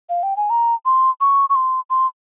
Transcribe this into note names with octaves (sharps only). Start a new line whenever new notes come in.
F5
G5
G#5
A#5
C6
C#6
C#6
C6
C6